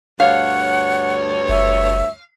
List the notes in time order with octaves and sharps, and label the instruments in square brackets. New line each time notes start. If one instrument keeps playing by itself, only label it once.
[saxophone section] D2 G2 C#5 [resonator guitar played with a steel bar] F5 [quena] F#5
[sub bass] F#1 [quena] E5